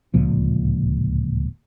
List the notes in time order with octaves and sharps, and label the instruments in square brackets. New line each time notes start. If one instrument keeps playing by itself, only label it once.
[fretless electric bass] D1 C#2 A#2 F3